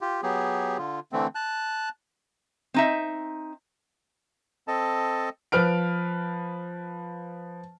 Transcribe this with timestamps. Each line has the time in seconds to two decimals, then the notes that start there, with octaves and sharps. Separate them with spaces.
0.01 F4 G4
0.23 F#3 B3 G4 G#4
0.78 D3 F4
1.13 D3 E3 A3 C4
1.35 A5 F#6
2.74 C4 D#4 E5
4.68 C4 A4 D#5 A5
5.52 F3 B4 F6 D7